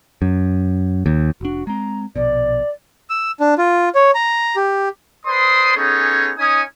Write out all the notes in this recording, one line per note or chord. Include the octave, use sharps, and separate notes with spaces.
F#2
D#2
F1 D4 F#4
G#3 C4 A#5
A#1 B2 D5
E6
D4
F4
C#5
A#5
G4
B4 C5 D5 C6 D#6
B3 C#4 D#4 G#4 A4 C#5
C#4 D#4 G#5 D#6